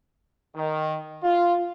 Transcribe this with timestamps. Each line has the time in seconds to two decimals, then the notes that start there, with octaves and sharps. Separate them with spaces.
0.56 D#3
1.24 F4